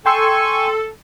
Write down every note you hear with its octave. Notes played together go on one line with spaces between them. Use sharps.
A4 G5 G#5 C6 C#6 E6